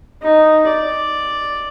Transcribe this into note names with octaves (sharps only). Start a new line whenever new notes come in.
D#4
D5